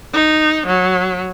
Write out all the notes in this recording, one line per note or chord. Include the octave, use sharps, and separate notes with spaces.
D#4
F#3